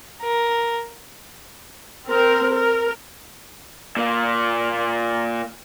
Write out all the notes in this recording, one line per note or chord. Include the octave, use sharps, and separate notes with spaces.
A#4
C4 A#4
A#4
A#2 A#3